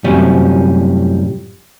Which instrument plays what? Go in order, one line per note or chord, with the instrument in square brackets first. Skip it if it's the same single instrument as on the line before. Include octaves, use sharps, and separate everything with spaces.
[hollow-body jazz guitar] F#2 A2 C3 F3 G3 C#4